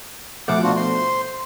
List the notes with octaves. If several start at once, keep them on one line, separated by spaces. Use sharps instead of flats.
B2 F3 A3 F#5 D6
D4 F4 F#4
C5 C6